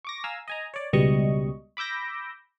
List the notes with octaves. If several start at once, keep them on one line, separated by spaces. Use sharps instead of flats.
C#6 D6 A#6
F5 G#5 A#5 E6
D#5 G#5 A#5
C#5 D5
C#2 B2 G3 D#5 C#6
B5 D6 E6 G6 A#6